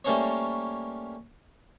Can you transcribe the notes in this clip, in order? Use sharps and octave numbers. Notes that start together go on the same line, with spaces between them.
G3 A3 A#3 C#4 C5 C#5